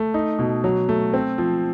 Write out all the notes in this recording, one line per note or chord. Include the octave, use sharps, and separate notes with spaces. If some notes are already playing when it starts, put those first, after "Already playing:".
Already playing: A3
D#4
B2
F#3
A3
C4
F3